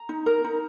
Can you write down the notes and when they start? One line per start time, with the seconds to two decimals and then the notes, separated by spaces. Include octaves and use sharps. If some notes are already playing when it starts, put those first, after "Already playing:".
Already playing: A#5
0.09 D#4
0.26 A#4
0.44 D#4